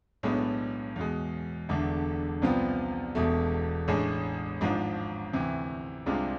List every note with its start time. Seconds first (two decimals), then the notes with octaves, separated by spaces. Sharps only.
0.23 B1 A2 G#3 B3 D4
0.96 E2 B2 G#3
1.69 E1 E2 D3 A3 D4
2.42 C2 C3 F3 B3
3.15 E1 E2 B2 A3
3.88 A1 A2 G#3 D4 G#4
4.61 G#1 G#2 F3 G#3 D4
5.33 D2 C3 E3
6.06 C2 C3 G#3 D4 F4